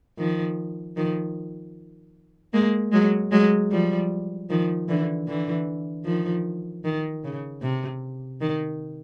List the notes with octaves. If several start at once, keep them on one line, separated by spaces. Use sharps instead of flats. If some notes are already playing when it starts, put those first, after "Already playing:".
D#3 F3
D#3 F3
G#3 A#3
F#3 G#3
F#3 G#3
F3 G3
D#3 F3
D3 E3
D3 E3
D#3 F3
D#3
C#3
C3
D#3